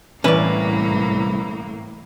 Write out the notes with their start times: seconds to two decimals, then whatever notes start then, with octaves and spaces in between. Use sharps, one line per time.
0.24 C2 A2 E3 A#3 C#4 B4 D5